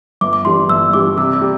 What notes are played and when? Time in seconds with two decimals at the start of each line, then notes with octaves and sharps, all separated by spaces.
0.21 G1 D6
0.33 D6
0.45 G2 E3 G3 C6
0.69 G1 E6
0.94 G2 E3 G3 D6
1.17 C3 E6
1.33 D6
1.41 G3